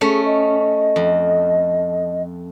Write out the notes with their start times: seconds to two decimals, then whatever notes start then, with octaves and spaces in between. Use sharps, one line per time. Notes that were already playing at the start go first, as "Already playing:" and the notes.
0.01 A3 C#4 G#4
0.25 D#5
0.96 F2